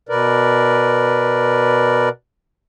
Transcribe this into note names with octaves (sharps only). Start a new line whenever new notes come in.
B2 A#4 B4 D5